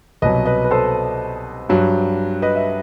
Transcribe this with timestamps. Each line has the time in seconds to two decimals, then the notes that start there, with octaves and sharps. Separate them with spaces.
0.22 C2 B2 F#3 B4 D#5
0.46 B4 D#5
0.65 B4
0.71 A4 C5
1.69 G2 F#3
2.42 B4 D#5
2.56 E5